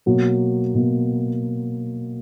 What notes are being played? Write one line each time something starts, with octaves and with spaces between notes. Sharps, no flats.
B2 F#3 A#3
B2 F#3 A#3